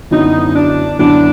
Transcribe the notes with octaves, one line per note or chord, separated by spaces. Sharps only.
F#2 D3 F#3 B3 D#4 E4
D4
F#2 D3 F#3 B3 D4 E4